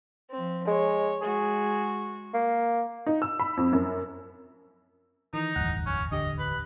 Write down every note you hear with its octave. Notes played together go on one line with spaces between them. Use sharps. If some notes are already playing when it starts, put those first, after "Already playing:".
F3 C4
G#3 C#5
G#3 F#4 G#4
A#3
D#4
E6
B5
F2
F#2
D#3 E3 D#4
D1 G1 E2 F#5
C#4
D3 G4 D#5
B4